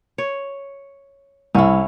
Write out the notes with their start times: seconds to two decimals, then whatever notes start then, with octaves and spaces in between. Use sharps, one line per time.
0.18 C#5
1.55 C2 C#4 E4